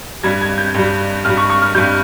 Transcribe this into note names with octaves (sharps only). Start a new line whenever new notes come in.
G2 G3 G#6
G#6
G6
G2 G3
G2 G3 F6
C#6
C#6
F6
G2 G3 G6